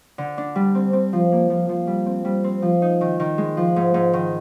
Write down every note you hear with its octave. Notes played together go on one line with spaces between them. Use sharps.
D3
D4
G3
C4
C4
F3
A#3
F3
F3
G3
C4
G3
C4
F3
D#4
D#3
D#3
G#3
F3
G#2
G#2
D#3